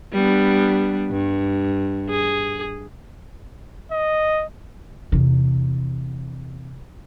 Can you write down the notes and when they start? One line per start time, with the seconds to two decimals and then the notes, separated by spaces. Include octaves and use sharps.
0.13 G3 B3 D4
1.10 G2
2.10 G#4
3.92 D#5
5.12 E2 C3